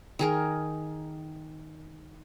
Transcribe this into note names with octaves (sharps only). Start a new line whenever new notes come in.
D#3 G#4 A#4